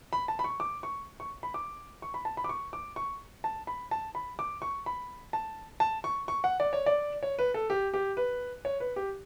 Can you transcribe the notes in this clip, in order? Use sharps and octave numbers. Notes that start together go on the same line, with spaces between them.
B5
A5
B5
C#6
D6
C#6
C#6
B5
D6
C#6
B5
A5
B5
D6
C#6
D6
C#6
A5
B5
A5
B5
D6
C#6
B5
A5
A5
C#6
C#6
F#5
D5
C#5
D5
C#5
B4
A4
G4
G4
B4
C#5
B4
G4